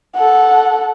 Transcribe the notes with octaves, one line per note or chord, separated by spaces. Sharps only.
A4 F#5